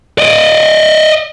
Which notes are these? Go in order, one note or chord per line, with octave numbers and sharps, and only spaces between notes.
D5 D#5